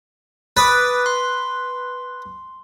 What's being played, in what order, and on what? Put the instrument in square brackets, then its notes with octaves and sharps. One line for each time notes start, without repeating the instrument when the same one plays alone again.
[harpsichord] B4 [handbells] D6 D#6 A6
[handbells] C6